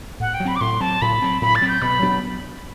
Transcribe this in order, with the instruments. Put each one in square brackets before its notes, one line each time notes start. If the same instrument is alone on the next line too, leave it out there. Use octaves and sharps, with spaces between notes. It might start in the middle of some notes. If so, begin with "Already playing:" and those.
[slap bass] A2 [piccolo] F#5
[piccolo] G5
[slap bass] F#3
[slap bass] C4 [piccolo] B5
[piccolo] D6
[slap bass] A2 [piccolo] C6
[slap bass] F#3 C4 [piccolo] A5
[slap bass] A2 [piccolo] B5
[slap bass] F#3 C4
[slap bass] A2 [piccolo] B5
[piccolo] A6
[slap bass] F#3 C4
[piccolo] G6
[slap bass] B2 [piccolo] B5
[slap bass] F#3 B3 D4